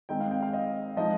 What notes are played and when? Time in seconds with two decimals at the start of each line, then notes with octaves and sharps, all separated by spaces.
0.09 D#3 G#3 C4 D#4 G5
0.20 F5
0.31 G5
0.43 F5
0.53 D#5
0.97 F3 G#3 D#4 D#5